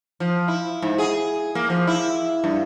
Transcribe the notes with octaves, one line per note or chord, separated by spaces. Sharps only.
F3
E4
G#2
G#4
A#3
F3
E4
G2